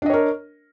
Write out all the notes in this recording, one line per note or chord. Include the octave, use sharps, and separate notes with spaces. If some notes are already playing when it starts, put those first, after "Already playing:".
D4 A#4 C#5 D#5